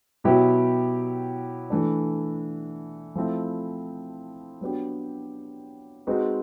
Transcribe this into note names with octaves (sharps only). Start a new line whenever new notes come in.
B2 F#3 B3 E4 G4
E3 A3 D4
F3 A3 C4 E4
F#3 B3 D4 G4
G#3 C4 D#4 F#4 B4